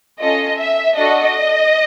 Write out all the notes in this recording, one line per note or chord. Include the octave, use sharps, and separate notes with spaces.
C#4 F4 A4 D#5
E5
D4 F#4 A4 D#5